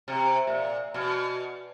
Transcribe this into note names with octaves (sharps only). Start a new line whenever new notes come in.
C3
A#2
B2